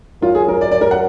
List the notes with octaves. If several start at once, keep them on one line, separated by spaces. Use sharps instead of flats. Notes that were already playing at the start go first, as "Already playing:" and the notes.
F#2 F4
G#4
A#4
D5
D5
A#4
F#5